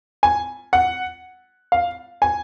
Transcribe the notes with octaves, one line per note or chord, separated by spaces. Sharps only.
G#5
F#5
F5
G#5